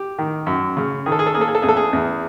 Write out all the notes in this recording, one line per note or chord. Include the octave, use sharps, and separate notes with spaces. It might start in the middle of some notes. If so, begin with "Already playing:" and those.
Already playing: G4
D#3
F#2
C#3
D#3 G#4
A4
G#4
A4
A#3 G#4
A4
G#4
A4
E2 G#4
A4
G#4
E2